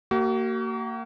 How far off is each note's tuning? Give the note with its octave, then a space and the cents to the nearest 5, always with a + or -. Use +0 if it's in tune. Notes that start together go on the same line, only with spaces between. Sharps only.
A#3 -25 F#4 +40